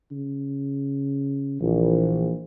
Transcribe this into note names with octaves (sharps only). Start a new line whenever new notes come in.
C#3
A#1 E3